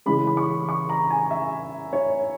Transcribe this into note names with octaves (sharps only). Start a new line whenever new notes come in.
C#3 E3 G#3 B5
B5
C#6
C#6
A#5
G#5
E5
C#5